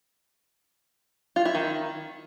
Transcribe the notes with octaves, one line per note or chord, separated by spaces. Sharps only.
F4
E4
D#3